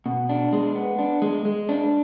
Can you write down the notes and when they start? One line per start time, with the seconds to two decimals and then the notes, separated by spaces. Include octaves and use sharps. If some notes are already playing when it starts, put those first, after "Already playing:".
0.06 B2
0.29 D4
0.53 G#3
0.76 B3
0.99 D4
1.22 G#3
1.45 G#3
1.69 D4